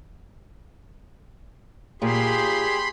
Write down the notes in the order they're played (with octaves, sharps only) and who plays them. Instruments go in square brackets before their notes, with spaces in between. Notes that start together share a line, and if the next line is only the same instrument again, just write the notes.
[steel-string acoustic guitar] A#2 [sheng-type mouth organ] G4 G#4 [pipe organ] B5 C6